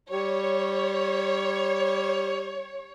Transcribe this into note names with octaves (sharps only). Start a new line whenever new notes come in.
G3 C#5